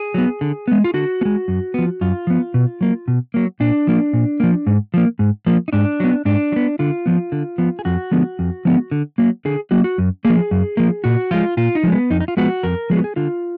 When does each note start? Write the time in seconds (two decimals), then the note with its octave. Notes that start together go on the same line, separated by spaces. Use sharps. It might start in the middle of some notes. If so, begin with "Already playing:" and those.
Already playing: G#4
0.14 F#3 B3
0.41 D3
0.68 G#3 B3
0.84 F4
0.94 D3 F#4
1.21 B3
1.25 G#3
1.48 F#2
1.74 F3 B3
2.01 F#2 F4
2.27 F3 B3
2.54 B2
2.81 F#3 A#3
3.08 B2
3.34 F#3 A#3
3.60 A#2 D4
3.87 F3 A#3
4.13 A#2
4.40 F3 A#3
4.67 G#2
4.94 F3 A#3
5.19 G#2
5.46 F3 A#3
5.68 D#4
5.73 G#2 D4
6.00 F#3 B3
6.25 G#2 D4
6.52 F#3
6.56 B3
6.79 D3 F4
7.06 F3 B3
7.32 D3
7.58 F3 B3
7.79 G#4
7.85 F2 F#4
8.11 D3 F3 G#3 B3
8.39 F2
8.65 D3 F3 G#3 B3
8.91 D3
9.18 F#3 A#3
9.45 D3 G#4
9.71 F#3 A#3 F#4
9.84 F#4
9.98 F#2
10.25 F3 A#3 G#4
10.51 F#2
10.77 F3 A#3
11.04 A#2 F#4
11.31 F3 G#3 F4
11.57 A#2 F4
11.75 D#4
11.83 F3 G#3
11.92 B3
12.10 F2 D#4
12.21 D#4
12.28 F4
12.37 F3 G#3 B3 F#4
12.63 F2 A#4
12.90 F3 G#3 B3 G#4
12.97 F#4
13.04 G#4
13.16 D3 F4